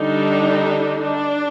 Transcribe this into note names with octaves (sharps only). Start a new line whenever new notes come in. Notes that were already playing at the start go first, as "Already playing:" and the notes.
Already playing: D3 G3 D4 D#4
D4